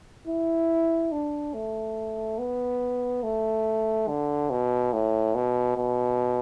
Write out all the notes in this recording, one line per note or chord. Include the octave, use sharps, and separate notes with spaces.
E4
D4
A3
B3
A3
D3
B2
A2
B2
B2